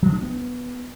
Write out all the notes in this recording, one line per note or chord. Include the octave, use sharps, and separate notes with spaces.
F3
D4
B3